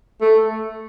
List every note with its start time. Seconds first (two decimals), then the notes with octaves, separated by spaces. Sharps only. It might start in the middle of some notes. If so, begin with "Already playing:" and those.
0.21 A3